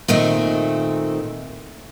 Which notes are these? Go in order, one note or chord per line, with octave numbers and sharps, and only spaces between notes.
A#2 D#3 A3 C4